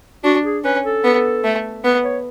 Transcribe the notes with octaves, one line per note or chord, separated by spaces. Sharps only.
D4 F#4
G#4
C#4 B4
A4
B3
A3
B3 B4
C#5